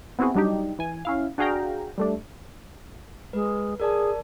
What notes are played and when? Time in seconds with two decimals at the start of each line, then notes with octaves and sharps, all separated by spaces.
0.19 B3 C4 E4 F#4 G#4
0.35 F#3 G3 D4 D#4 G4
0.79 E3 G#5
1.05 C#4 E4 F5
1.38 D4 F#4 G#4 F5 G5 A#5
1.98 G3 A3 D4
3.33 G#3 B4
3.80 G#4 A#4 D5 A5